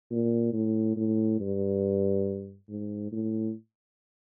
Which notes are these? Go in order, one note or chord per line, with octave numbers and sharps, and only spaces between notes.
A#2
A2
A2
G2
G#2
A2